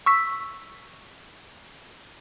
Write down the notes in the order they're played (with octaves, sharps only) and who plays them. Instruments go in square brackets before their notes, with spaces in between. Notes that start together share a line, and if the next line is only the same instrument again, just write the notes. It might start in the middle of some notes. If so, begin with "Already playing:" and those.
[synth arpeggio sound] C#6 E6 B6